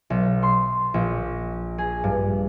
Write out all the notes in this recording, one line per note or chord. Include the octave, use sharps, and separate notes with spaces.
B1
C6
A#1
G#4
G2